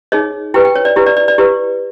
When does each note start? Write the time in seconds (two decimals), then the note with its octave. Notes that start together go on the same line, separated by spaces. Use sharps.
0.12 D#4 G#4 C#5 D#5
0.54 E4 G4 B4 G5
0.65 G5
0.76 C#5
0.85 D5
0.96 E4 G4 B4
1.06 D5
1.17 D5
1.28 D5
1.38 E4 G4 B4